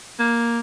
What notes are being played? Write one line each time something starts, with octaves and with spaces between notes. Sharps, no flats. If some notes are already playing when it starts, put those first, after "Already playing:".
A#3